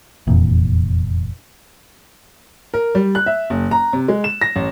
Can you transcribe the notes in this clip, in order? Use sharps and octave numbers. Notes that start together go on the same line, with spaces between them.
F1 E2 A#2
A#4
G3
F#6
E5
F#1
A#5
C3
G#3
E7
A#6
A1